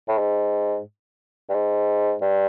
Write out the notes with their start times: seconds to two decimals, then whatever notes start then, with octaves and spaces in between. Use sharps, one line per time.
0.08 A2
0.19 G#2
1.49 G2
1.54 G#2
2.21 G2